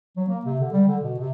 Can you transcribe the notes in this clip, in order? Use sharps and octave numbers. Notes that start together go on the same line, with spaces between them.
F#3
A#3
C3
D3
G3
D3
B2
C3